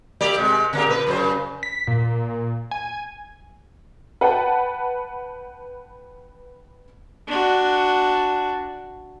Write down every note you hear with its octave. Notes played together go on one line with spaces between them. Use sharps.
A3 G4 D5
C3 G#3
C#3 A#3 G4
A#2 B4
F#2 C#3 C5
B6
A#2
G#5
B4 F#5 G5 A5 B5
D4 F#4